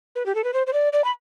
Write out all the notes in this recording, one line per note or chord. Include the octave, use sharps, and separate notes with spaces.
B4
G4
A4
B4
C5
C5
D5
D5
B5